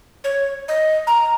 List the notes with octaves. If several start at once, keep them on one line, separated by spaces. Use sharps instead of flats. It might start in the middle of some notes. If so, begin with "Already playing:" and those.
C#5
D#5
A#5